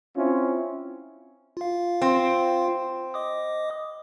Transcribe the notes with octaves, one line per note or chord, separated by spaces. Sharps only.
C4 C#4 E4 F4
F4 F5
C4
D#5 D6 D#6